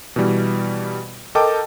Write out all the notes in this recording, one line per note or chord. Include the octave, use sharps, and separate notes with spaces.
B2 E3 G3
A4 A#4 D#5 G5 A5 D6